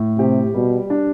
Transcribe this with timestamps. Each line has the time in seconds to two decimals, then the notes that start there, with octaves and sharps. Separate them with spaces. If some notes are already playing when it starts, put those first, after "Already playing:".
Already playing: A2
0.19 C3 G4
0.54 B2 G3
0.90 D4